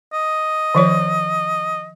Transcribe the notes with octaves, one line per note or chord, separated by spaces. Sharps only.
D#5
D#3 F3 C#5